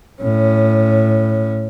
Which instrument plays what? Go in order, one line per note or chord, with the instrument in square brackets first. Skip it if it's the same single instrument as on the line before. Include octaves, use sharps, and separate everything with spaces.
[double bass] A2 C#4